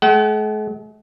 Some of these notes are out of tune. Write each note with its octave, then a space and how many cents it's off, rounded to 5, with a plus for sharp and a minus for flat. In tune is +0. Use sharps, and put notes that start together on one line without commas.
G#3 +45 F#5 +40